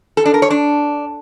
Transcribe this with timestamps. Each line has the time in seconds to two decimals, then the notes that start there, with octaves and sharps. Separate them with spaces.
0.17 A4
0.26 D4
0.34 A#4
0.42 C#5
0.50 D4